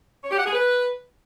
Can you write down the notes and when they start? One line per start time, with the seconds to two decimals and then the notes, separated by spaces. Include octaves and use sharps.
0.24 C#5
0.31 G4
0.38 F#5
0.46 G#4
0.53 B4